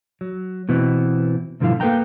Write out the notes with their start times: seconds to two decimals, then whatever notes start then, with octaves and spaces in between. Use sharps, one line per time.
0.21 F#3
0.69 B2 E3 B3 C4
1.60 G2 B2 D3 F3 E4 F5
1.80 A#3 A4 B4 F5 G5 A#5